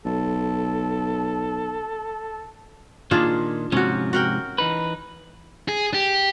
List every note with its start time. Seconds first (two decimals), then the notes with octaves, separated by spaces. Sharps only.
0.05 B1 A4
3.11 A#2 D#3 D4 F4 G#4
3.72 G#2 C3 F3 C#4 F#4
4.13 F#4 A#4 G5
4.58 E3 D#4 B4
5.68 G#4
5.94 G4